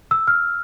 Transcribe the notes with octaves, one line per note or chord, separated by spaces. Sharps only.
E6
F6